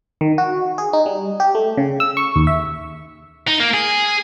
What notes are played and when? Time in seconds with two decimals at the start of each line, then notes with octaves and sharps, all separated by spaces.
0.21 D#3
0.38 F#4
0.78 G#4
0.93 D#4
1.06 G3
1.40 G4
1.55 A3
1.77 C#3
2.00 E6
2.17 C#6
2.36 D#2
2.47 E5
3.47 D#4
3.60 A#3
3.74 G#4